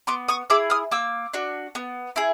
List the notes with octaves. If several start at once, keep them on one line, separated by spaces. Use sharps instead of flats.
B3 C6 D6
C#6 D#6
E4 G#4 D6 E6
D#6 F6
A#3 D6 E6
D4 F#4
B3
E4 G#4